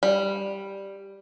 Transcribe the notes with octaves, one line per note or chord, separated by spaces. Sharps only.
G3